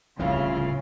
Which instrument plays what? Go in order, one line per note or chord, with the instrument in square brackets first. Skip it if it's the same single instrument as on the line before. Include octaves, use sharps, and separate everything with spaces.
[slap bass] D1 C2 F3 [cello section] C#3 [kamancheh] E4 F4